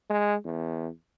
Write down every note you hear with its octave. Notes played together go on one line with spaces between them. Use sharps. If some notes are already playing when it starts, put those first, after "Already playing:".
G#3
E2